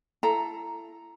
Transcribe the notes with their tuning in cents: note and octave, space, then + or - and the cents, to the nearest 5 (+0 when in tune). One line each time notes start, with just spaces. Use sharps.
E4 +30 A4 +0 A#5 +0